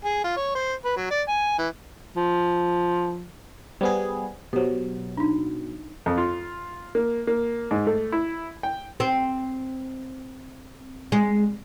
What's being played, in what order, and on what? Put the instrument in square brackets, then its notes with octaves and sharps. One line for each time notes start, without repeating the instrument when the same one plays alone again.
[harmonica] G#4
F4
C#5
C5
B4
F#3
D5
G#5
E3
[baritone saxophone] F3
[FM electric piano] G3 B3 G#4 [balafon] C5
[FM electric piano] B2 F#3 [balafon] G4 C5
[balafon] D4 D#4
[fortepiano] F2
F4
A#3
A#3
G#2
A3
E4
G5
[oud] C4
G#3